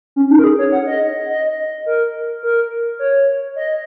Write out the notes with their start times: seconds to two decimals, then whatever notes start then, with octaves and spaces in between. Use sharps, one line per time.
0.16 C#4
0.30 D#4
0.39 A#4
0.44 G#4
0.59 C#5
0.72 F#5
0.87 D#5
1.29 D#5
1.86 A#4
2.43 A#4
2.99 C#5
3.56 D#5